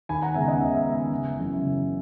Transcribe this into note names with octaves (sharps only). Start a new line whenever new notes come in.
D#2 G#5 B5
F#5 A#5
C#3 G#3 B3 E5 G#5
D#5 F#5
D#2 E5
E5
C#3 G#3 B3
E5 G#5
F#1
F#2 C#3 E3
F#1